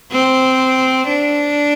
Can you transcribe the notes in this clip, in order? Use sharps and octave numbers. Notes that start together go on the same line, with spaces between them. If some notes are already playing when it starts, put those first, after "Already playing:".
C4
D4